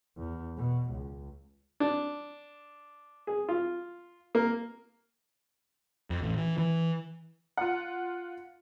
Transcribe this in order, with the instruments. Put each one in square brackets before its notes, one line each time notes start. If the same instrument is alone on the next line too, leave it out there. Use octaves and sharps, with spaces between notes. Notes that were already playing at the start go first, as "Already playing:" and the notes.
[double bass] E2
B2
C#2
[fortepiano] D4
G#4
F4
A#3
[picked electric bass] F2
A1
E3
E3
[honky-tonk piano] F4 F#5